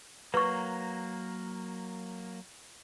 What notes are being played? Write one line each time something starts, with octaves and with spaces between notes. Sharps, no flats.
F#3 A#3 B4 C#6